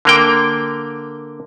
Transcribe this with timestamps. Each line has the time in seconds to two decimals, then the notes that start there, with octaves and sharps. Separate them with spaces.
0.05 D3 A#3 G5